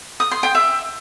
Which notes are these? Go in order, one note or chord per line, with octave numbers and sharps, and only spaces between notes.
D#6
C6
G5
E5